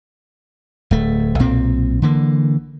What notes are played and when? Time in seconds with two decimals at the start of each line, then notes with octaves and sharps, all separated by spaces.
0.91 D1 A3
1.39 B1 A#2 C4
2.02 D3 E3 A#3